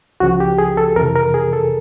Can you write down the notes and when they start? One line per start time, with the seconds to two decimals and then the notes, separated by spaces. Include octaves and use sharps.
0.20 C#2 C#3 F3 F#4
0.40 G4
0.58 G#4
0.77 A4
0.96 F2 C3 E3 A#4
1.16 A#4
1.34 G#4
1.53 A4